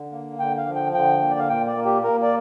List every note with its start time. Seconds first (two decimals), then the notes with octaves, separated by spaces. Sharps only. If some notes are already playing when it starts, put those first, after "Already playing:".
Already playing: D3
0.11 A#3
0.39 D3 G5
0.58 F5
0.67 F3
0.75 G5
0.94 D3 G5
1.21 A#3
1.31 D5
1.39 F5
1.49 A#2 G5
1.67 D5
1.77 A#3
1.85 G4
2.04 A#3 A#4
2.23 D5